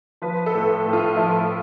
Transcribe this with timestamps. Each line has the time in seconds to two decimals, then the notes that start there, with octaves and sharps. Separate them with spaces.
0.22 F3 B4
0.46 A4
0.54 A2
0.85 A2
0.93 F4
1.16 F3 E4